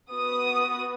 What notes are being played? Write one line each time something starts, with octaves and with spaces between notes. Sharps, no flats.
B3 F#4 D#6